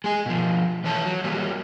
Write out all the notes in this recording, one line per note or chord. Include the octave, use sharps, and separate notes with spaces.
G#3 G#4
B2 F3
E3 A3 C#5 A5
F#3
F#3 G3 A#3